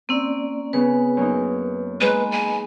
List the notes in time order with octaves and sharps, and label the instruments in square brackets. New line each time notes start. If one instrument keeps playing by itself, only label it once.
[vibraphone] A#3 C#4 D5 [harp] C4 E6
[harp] C#3 B3 C#4 [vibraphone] B4
[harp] F#2 A#3 D#4
[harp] G#3 [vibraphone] A#3 D#5 B5 [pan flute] B4
[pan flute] G#5